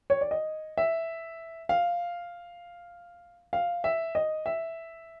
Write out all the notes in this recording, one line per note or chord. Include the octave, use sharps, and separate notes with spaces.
C#5
D5
D#5
E5
F5
F5
E5
D#5
E5